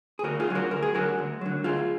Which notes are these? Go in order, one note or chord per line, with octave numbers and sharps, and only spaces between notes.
G#4
D2 F#4 A#4
F4 G#4
D3 F#3
F#4 A#4
D2 A#4
G#4
D3 F#3 F#4 A#4
D2
D3 F#3
D2 F4 G#4